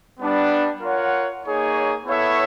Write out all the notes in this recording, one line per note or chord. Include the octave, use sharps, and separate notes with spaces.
G3 B3 D4
F4 A#4 C#5 F#5
A#3 D#4 G#4 C#5
B3 E4 A4 C#5 E5